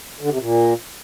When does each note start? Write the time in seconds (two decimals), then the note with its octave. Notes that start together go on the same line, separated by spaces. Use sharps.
0.21 D3
0.30 C3
0.39 A#2